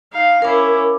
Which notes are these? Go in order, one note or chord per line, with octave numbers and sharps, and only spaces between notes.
D#4 F5
C#4 E4 A#4 D6